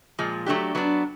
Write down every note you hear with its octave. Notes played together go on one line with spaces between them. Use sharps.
A#2 F3 G#3
F#3 A3 D4 G4
F#3 B3 D4